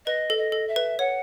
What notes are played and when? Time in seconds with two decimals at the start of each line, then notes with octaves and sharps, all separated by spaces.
0.06 B4 D#5
0.30 A4
0.38 D#5
0.52 A4
0.68 E5
0.76 B4
0.99 C#5 F#5